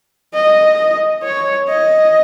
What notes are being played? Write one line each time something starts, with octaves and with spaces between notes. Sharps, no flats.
D#5
C#5
D#5